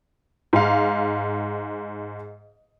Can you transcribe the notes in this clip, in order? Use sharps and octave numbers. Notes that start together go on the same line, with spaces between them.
G#2 F5